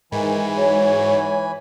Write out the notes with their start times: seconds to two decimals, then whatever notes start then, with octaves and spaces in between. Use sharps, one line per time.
0.12 G#2 D#3 E3 G#5 B5
0.57 F#3 C#5